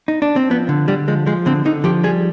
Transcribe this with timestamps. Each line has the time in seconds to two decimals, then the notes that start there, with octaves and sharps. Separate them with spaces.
0.08 D#4
0.22 D4
0.36 C4
0.50 F3 B3
0.69 D3
0.88 D3 G3
1.08 F3 G#3
1.27 F3 G#3
1.46 D3 C4
1.65 D3 D#4
1.84 F3 G4
2.03 G3 G#4